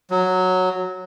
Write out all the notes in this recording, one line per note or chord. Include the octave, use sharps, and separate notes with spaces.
F#3